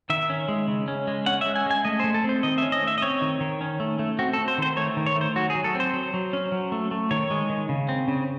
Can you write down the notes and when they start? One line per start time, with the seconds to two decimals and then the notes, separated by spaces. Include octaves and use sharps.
0.10 D#3 E5
0.29 C#4
0.48 G#3
0.68 C#3
0.88 C#4
1.07 G#3
1.26 C#4 F#5
1.41 G#3 E5
1.55 G#5
1.66 G#3 G#5
1.85 A3 D#5
2.00 A3 C5
2.14 A4
2.24 C4 C5
2.43 D#3 D#5
2.58 C#4 E5
2.72 D#5
2.83 A3 E5
2.98 D#5
3.02 C4 C#5
3.22 D#3
3.41 D#3
3.61 C#4
3.80 A3
3.99 A3
4.19 C4 F#4
4.33 A4
4.38 C4
4.48 C5
4.58 D#3 C5
4.77 A3 C#5
4.97 D#3
5.06 C#5
5.16 A3
5.21 C5
5.36 F#3 F#4
5.50 G#4
5.55 F#3
5.64 A4
5.75 C4
5.80 C5
5.93 F#3
6.14 F#3
6.33 C#4
6.52 F#3
6.72 A3
6.91 A3
7.11 D#3 C#5
7.31 G#3
7.50 D#3
7.69 C#3
7.89 C4
8.08 C#3